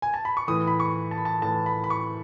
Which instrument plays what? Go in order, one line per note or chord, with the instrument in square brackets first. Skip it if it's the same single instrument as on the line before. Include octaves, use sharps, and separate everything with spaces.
[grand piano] G#5
A5
B5
C#6
A2 E3 D#6
B5
C#6
A5
B5
A5
A2 E3 A5
B5
B5
C#6